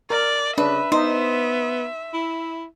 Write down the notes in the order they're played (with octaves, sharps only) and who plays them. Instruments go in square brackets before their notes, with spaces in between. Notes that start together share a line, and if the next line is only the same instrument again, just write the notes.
[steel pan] A#4 [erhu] D5
[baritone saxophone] C#3 [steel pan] D4 [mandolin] B4 [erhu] E5
[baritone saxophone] B3 [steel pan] D#4 [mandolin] C5
[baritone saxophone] E4